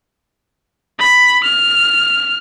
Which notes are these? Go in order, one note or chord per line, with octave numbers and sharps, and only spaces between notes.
B5
F6